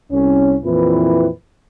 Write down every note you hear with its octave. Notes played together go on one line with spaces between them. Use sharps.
C2 C#4
F2 A#2 E3 C4 E4 B4